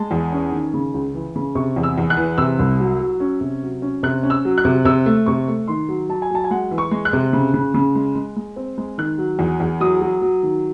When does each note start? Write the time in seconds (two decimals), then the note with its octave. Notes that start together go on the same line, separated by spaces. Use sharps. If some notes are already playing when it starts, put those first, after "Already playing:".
Already playing: G#3 A5
0.11 E2
0.33 C#4
0.52 D#3
0.74 C#3
0.94 C#2
1.14 E3
1.36 C#3
1.55 C3 C#6
1.76 E2
1.83 E6
1.98 E2
2.10 F#6
2.17 E3
2.38 C3 E6
2.59 C2
2.80 F#3
3.00 F#3
3.20 C#4
3.41 C3
3.63 F#3
3.82 C#4
4.03 C3 F#6
4.23 C#4
4.30 E6
4.45 F#3
4.58 F#6
4.65 C3
4.85 C3 E6
5.06 A3
5.26 C3 C#6
5.48 A3
5.68 D#3 C6
5.89 F#3
6.09 F#3 A5
6.22 G#5
6.31 F#3 A5
6.44 G#5
6.51 G#3 F#5
6.71 E3
6.78 C#6
6.91 G#3
7.05 F#6
7.13 C3
7.33 C#3
7.54 C#3
7.74 C#3
7.95 G#3
8.15 G#3
8.36 G#3
8.56 C4
8.78 G#3
8.98 D#3 F#6
9.18 F#3
9.39 E2
9.60 E2
9.80 F#3 D#6
10.01 F#3
10.22 F#3
10.43 D#3